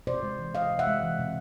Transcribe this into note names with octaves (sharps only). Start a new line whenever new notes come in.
C3 C5 D5
G#3
E3
C3 D#5 F5
C3
E5 F#5
G#3
E3
C3